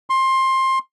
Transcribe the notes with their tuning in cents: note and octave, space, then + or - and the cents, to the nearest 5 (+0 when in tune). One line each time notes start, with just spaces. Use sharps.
C6 +20